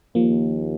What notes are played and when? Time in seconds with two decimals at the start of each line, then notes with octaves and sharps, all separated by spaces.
0.15 D#2 F3 A#3